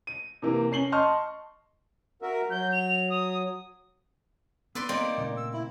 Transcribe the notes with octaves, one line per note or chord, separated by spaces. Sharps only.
D#7
C3 E3 A#3
C#4 C7 F#7 G7
D#5 A5 C6 C#6 F6
F#4 A#4 E5
F#3 G6
F7
D#6
B3 B4 D5 C6 E6
A#3 C4 D#4 C5 D5
A#2 C#3 A3
E6
E4